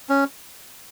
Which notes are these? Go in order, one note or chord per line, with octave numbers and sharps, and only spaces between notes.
C#4